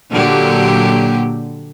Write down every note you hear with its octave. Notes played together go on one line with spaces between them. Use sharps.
A#2 D3 F#3 A#3 G4